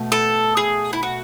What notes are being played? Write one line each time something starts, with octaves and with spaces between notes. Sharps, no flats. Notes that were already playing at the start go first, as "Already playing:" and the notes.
Already playing: B2 A3
A4
G#4
E4
F#4